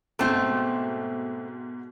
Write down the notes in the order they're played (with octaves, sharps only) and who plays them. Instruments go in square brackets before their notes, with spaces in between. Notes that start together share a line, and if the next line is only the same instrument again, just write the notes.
[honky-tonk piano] G#2 B2 [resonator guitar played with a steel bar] A3 C4